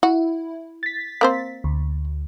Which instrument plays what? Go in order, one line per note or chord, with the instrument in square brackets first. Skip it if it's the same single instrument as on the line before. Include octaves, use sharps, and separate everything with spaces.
[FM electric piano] E4 [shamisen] F#4
[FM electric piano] A6 B6
[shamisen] A#3 C4 C5
[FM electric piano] D2